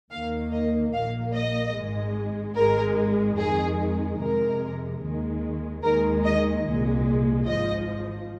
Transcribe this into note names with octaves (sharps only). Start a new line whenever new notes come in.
D#2 D#3 A#3 F5
D#5
A#1 A#2 A#3 F5
D#5
G#1 G#2 G#3
G#1 G#2 G#3 A#4
F2 D#3 G#3 G#4
F2 C3 G#3 A#4
D#2 D#3 G#3
D#2 D#3 G#3 A#4
D#5
C2 A#2 G#3
G#1 G#2 F3 D#5